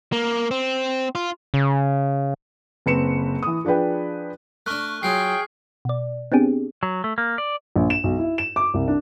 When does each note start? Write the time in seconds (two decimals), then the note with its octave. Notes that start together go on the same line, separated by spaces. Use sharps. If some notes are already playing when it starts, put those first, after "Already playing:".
0.12 A#3
0.51 C4
1.15 F4
1.54 C#3
2.86 F#1 C4 B4 C#7 E7
3.43 E3 D#6
3.65 F3 D4 G#4 B4 G5
4.66 A3 D4 C#6 F6 F#6
5.03 F#3 F4 G#4 G5 C7
5.85 B2 D5
6.32 B3 C4 D4 G4 G#4
6.83 F#3
7.04 A3
7.18 A#3
7.38 D5
7.76 A#1
7.90 E7
8.04 B1
8.19 E4
8.38 E7
8.56 D6
8.74 C2
8.88 D4